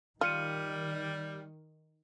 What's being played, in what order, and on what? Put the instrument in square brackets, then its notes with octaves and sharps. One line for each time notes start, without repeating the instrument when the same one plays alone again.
[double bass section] D#3 [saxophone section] G3 [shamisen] F4 [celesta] F6 C#7 D#7